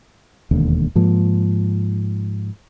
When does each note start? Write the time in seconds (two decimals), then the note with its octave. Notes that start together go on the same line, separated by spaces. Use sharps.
0.51 E1 D#2 D3
0.95 G#2 F3 A#3